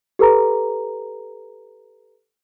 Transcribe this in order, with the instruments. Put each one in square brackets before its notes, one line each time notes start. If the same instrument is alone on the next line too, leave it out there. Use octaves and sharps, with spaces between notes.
[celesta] G4 A4 B4 A#5